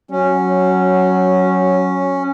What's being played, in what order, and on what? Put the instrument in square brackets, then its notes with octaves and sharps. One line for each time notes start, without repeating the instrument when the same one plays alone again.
[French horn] F#3 [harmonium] C#4